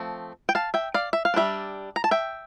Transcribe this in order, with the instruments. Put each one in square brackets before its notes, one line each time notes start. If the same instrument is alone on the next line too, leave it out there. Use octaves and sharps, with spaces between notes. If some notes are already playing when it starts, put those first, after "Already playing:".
Already playing: [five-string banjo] F3 A3 C4
G5
F5 A5
E5 G5
D5 F5
E5
F5
G3 D4 C5 E5
A#5
A5
E5 G5